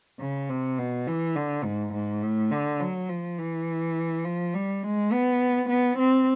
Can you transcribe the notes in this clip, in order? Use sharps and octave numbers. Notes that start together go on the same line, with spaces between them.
C#3
C3
B2
E3
D3
G#2
G#2
A2
D3
F#3
F3
E3
F3
G3
G#3
B3
B3
C4